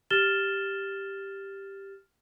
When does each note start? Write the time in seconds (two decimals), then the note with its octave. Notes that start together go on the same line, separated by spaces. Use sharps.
0.10 G4 F6 A6 E7 G7